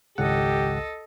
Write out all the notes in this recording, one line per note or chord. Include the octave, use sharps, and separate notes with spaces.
G#1 C#2 G4 A4 D#5 F#5